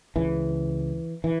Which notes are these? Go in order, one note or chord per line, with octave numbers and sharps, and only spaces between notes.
C#2 C#3 E3
E3